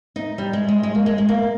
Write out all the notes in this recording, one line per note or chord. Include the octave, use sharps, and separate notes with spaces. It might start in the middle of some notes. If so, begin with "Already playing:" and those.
D#4
G3
G#3
G#3
G#3
A#3
G#3
G#3
A#3